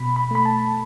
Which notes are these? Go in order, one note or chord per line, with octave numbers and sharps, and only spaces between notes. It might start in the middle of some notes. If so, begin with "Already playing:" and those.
Already playing: B2 B5
B5
A3 B5
A5